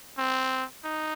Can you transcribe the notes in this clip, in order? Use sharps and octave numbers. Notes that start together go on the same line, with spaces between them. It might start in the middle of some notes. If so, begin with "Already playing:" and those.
C4
D#4